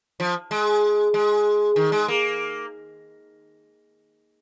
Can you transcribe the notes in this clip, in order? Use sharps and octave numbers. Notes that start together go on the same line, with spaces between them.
F3
G#3
G#3
D#3
G#3
A#3